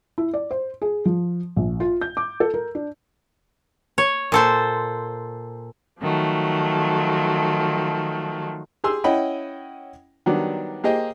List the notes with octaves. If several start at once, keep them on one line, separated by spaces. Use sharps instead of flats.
E4
D5
C5
G#4
F3
A#1
F4
G6
D6
A4
A#4
D4
C#5
A#2 A4 C5
D#3 F3 F#3 A3
G4 G#4 C6 E6
C#4 E4 D#5 F#5 G5 B5
D#3 F#3 G3 B3 D4
A#3 G4 G#4 C5 D#5 G5